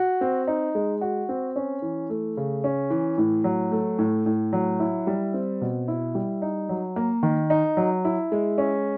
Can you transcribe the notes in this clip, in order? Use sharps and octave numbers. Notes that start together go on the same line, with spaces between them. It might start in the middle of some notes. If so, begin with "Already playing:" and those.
Already playing: F#4
C4
D#4
G#3
F#4
C4
C#4
E3
A3
C#3
C#4
E3
A2
F#3
A3
A2
A2
F#3
E4
G3
C4
B2
E4
G3
D#4
F#3
A#3
D#3
D#4
F#3
E4
G#3
C#4